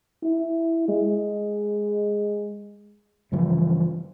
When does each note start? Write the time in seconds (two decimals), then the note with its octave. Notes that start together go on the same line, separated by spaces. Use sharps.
0.23 E4
0.88 G#3
3.32 G2 C#3 E3 F3